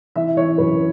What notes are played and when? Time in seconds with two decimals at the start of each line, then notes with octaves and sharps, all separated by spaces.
0.16 E3 E5
0.37 E3 C#5
0.58 F#2 B4